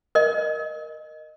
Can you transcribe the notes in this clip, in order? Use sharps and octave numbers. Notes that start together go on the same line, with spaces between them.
A#4 D#5